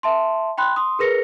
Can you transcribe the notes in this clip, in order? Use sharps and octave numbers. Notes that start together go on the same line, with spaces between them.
E5 A5 C6
G5 B5 C6 F#6
C6 D#6
G#4 A#4 B4 A#6 C#7